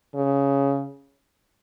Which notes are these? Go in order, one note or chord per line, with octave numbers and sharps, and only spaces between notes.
C#3